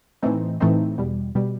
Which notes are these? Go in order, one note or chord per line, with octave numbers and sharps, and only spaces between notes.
A2 E3 A3 C4 D#4
A2 E3 A3 C4 D#4
E2 B2 G3
B2 G3